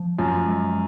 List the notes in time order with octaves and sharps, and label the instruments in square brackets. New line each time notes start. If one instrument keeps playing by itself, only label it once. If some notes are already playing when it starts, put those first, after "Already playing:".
Already playing: [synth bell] F3
[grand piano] F#2 [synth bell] F4
[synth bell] G#3